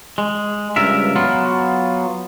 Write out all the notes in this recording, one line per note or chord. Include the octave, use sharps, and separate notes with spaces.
G#3
C#2 G2 A#4 E5
F#3 B3 F4